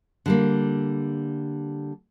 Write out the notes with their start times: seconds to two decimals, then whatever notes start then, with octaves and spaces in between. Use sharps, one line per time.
0.26 D3 G3 A#3